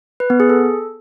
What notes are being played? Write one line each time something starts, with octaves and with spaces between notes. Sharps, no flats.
B4
B3
G#4
A4